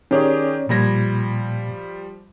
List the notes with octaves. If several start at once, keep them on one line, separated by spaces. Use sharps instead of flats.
D#3 C#4 G4 G#4 C#5 D5
A#2 F3 G3 B5 G#6 A#6